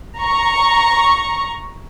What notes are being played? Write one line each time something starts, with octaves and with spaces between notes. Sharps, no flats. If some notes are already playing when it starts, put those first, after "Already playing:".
A#5 C#6